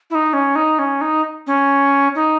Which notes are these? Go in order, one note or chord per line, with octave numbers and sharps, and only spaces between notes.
E4
D#4
C#4
D#4
C#4
D#4
C#4
D#4